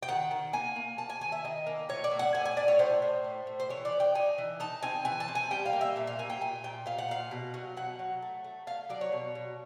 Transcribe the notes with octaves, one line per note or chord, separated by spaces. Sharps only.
G5
D#3 F#5
D#3
A#3 G#5
A#3
A#3 A5
G#5
D#3 G#5
E5
D#3 D#5
A#3
A2 C#5
D5
A2
F#5
A2 G#5
G#5
A2 D5
C#5
A2 C5
A2
A3
A2
C5
E3 C#5
D5
E3
G5
D#4 G#5
E3
D#4 A5
C4 G#5
E3 G#5
A5
C4
G#5
G3 G5
F5
A#3
E5
A#2 E5
F5
A#3 G#5
G5
A#2 G#5
A#2 G5
A#2 F5
F#5
A#2 F5
B2
F#3
B2 F#5
F#3
A3
A3
A3 F5
F#3 D5
C#5
B2
B2